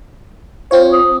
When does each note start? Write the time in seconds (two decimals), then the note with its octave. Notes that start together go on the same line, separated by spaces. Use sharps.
0.71 C4 F4 C5 C#5
0.92 D#6